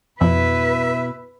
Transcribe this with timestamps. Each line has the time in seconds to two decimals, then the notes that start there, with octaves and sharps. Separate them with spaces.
0.21 F2 B2 E4 B4 E5